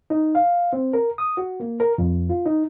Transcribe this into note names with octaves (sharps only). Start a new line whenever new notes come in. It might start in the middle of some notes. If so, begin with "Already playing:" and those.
D#4
F5
C4
A#4
D#6
F#4
A#3
A#4
F2
F4
D#4